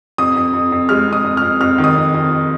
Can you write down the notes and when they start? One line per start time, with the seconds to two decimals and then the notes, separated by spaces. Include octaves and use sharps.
0.18 F2 D#6
0.36 F2
0.53 F2
0.72 F2
0.89 G#3 F6
1.07 F2
1.13 D#6
1.24 F2
1.37 F2 F6
1.61 F2 F6
1.78 D#3
1.84 D#6
1.96 F2
2.14 F2
2.31 F2